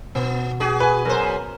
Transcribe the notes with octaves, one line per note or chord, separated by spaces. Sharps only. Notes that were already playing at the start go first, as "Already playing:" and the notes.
B2 B3
F#4 G#4
B4 G#5
F#2 A#4 C5